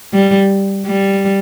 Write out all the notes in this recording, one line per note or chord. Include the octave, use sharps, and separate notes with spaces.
G3
G3